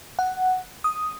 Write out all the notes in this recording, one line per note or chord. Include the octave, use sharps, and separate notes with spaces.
F#5
D#6